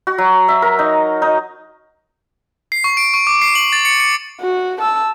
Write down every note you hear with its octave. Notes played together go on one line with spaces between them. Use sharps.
F#4
F#3
E5
A#4
D#4
D#4
C7
C#6
D7
C#6
D6
C7
F#7
A6
C#7
C#7
F#4
A5 E6